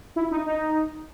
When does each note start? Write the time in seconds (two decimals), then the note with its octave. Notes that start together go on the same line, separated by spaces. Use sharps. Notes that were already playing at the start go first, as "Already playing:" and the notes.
0.16 E4
0.31 D#4
0.46 D#4